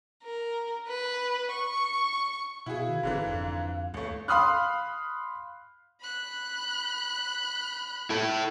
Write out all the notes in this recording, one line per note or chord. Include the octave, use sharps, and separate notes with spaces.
A#4
B4
C#6
B2 E4 F#4 G#4 F5
D#3
F#1 G#2 D3 E3
F2
A1 D#2 A3
F5 B5 C6 D#6 F6 F#6
B5 F#6
E4 A4